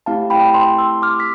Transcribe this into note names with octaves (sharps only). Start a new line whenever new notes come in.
A3 C4 E4 G4 F5 A5
G5 B5
A5 C6
C6 E6
D6 F6
B6